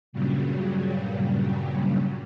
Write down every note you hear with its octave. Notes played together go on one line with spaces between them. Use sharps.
G2 A#2 C#3 F#3 G3